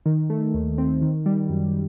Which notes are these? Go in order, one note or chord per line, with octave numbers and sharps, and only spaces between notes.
D#3
A3
D#2
C4
D#3
G3
F#2